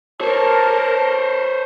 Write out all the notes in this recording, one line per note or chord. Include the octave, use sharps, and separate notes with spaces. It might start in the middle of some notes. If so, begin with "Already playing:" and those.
A#4 C5 C#5 A5